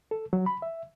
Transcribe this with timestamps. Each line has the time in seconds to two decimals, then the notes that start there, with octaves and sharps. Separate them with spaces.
0.11 A4
0.33 F#3
0.46 B5
0.62 E5